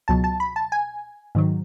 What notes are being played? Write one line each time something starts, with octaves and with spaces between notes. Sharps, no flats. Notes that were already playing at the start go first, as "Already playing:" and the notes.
C#2 B2 F#3 A5
A5
B5
A5
G#5
G#2 D#3 F#3